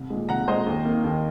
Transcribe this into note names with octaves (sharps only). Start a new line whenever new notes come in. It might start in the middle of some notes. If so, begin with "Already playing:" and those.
Already playing: C2
A#2 G#3
C2 F#5 A#5
A#2 G#3 C5 D#5
D#2
D#3 A#3
D#2